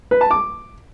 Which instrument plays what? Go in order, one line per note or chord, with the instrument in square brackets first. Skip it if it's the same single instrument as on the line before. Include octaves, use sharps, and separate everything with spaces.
[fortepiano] B4
A5
D6